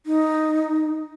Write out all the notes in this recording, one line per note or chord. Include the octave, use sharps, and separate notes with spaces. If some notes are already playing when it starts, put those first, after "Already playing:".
D#4